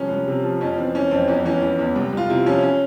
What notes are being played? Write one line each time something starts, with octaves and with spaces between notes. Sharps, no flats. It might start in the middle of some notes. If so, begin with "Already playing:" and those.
Already playing: C2 F3 C#4
C2
C3
F3
F2 C#4
E3 C4
E3 C#4
F2 C4
E2 C#4
E3 C#4
E3
E2
C2
C2 F4
C3 E4
F3 C#4
C#4